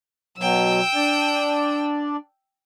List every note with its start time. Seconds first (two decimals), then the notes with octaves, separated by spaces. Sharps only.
0.38 B2 F#3 G5 E6
0.95 D4 D5